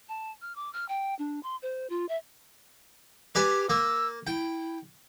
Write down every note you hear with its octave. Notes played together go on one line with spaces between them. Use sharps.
A5
F6
D6
F6
G5
D4
C6
C5
F4
E5
G4 B4 D5 G#5
A#3 E6
E4 G5